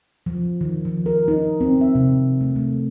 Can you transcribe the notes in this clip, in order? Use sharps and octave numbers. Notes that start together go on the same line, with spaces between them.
F3
D#3
F3
A#4
D#4
C4
E5
C3
A3
A3